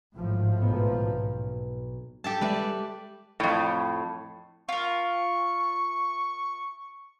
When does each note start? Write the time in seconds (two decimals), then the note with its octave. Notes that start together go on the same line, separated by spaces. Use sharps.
0.16 G#1 A2 F3
0.62 B1 B3
2.24 G4 A4 A5
2.41 G3 G#3 B4 D5 E5
3.40 F2 A2
4.69 F4 A#4 C#6